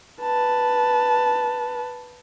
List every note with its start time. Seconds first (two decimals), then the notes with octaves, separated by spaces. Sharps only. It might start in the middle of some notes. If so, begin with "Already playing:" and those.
0.22 B4 A5